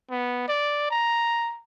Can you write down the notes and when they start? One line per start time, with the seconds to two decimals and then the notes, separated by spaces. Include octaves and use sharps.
0.10 B3
0.48 D5
0.90 A#5